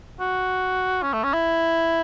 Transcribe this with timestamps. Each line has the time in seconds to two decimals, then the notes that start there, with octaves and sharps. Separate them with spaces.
0.20 F#4
1.03 C#4
1.13 A3
1.24 C#4
1.34 E4